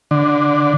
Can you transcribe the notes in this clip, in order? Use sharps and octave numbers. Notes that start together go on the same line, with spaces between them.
D3